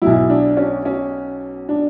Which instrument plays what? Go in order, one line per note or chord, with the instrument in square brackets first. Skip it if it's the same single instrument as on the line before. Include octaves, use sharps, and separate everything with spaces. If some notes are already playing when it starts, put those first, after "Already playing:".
[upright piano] B1 B2 F#3 E4
D4
C#4
C#4
D4